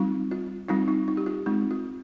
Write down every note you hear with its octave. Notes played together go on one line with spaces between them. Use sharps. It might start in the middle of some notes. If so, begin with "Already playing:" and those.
Already playing: G3 C4 D#4 F4
F4
G3 C4 D#4 F4
D#4
D#4
G4
F4
G#3 C4 D#4
F4